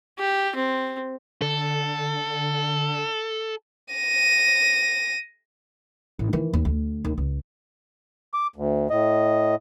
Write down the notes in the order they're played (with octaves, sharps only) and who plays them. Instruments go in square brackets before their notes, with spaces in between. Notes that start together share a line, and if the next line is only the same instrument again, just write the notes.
[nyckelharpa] G4
C4
[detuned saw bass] D3 [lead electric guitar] A4
[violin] A#6 D#7
[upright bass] A1
D#3 E3
D#2
D2
D#2
C#2
[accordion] D6
D2
A2 D#5